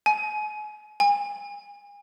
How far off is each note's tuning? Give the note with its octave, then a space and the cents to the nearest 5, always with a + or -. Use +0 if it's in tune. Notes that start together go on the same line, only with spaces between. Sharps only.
G#5 +35
G#5 -35